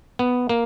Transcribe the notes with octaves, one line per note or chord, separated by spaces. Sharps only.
B3
A#3